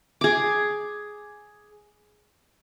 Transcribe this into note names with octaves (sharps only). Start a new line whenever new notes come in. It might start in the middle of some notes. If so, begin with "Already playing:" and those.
G#4 D6